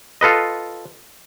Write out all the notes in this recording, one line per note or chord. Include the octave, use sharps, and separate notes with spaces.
F4 A4 B4 D#5